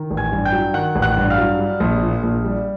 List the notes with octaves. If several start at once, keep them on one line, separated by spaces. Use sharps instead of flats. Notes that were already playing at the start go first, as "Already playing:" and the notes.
Already playing: D#3
A1
G#5 G#6
G2
G5 G6
F#3
D#3 F#5 F#6
A1
F#5 F#6
G2
F5 F6
F#3
G3
A#1
A#2
A#1
G3